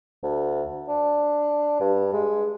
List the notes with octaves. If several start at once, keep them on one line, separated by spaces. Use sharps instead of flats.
D2
D4
G2
G#3